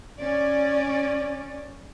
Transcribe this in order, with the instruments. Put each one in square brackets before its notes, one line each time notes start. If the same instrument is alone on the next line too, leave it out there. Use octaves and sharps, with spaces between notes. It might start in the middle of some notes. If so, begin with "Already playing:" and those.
[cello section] C#4 D5